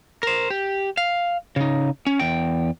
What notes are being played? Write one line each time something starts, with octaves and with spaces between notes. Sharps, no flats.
A#4 C5
G4
F5
C#3 D#4
C#4
E2 G5